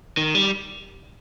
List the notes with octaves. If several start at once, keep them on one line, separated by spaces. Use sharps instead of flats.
D#3
G3